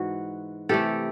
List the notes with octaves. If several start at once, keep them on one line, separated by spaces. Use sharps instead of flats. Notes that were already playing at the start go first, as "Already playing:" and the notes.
Already playing: G#2 E3 F#4
C3 E3 A3 G4 A4